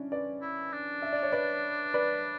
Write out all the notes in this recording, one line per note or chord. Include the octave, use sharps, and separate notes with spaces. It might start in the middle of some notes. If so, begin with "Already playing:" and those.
Already playing: C#4 D4 E4
B4 D5
E4
D4
E5
D5
C#5
B4 D5
B4 D5